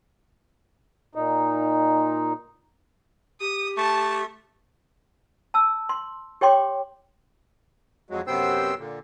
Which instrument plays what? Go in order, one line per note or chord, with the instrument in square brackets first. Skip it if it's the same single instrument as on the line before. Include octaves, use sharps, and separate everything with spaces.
[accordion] A#2 D#4
[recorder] G4 [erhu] D#6
[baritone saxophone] A3 [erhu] A5
[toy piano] A5 E6
C6
G4 C#5 G5 C6 D6
[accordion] F2 F#3 G#3
F#2 C3 B3 C5 G5 E6
A#2 D3